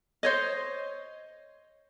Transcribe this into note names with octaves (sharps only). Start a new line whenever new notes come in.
C5 C#5 D#5